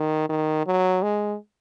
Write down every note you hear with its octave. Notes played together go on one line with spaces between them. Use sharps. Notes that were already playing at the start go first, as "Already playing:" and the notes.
Already playing: D#3
D#3
F#3
G#3